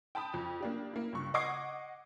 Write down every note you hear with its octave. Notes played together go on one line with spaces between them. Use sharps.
G5 A5 B5 D#6
F2
A#3 D4 G4
A#3 E4
C#2 G2 C#6
D#5 F#5 C#6 D6 G#6 C7